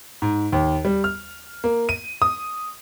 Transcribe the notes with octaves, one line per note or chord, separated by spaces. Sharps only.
G#2
D#2
G3
F6
A#3
D#7
D#6